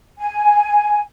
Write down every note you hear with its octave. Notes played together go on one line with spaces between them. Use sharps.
G#5